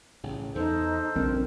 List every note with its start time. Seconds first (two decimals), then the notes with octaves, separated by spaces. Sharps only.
0.23 A1 C#3
0.55 E2 D#4 A4 C5
1.15 A#1 C#3 F3 G3 C4 D4 A#4